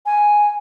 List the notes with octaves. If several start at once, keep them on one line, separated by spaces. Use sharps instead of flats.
G#5